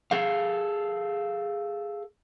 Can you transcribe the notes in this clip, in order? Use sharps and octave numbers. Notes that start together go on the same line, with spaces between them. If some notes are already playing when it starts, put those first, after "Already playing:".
G#4 A4 F5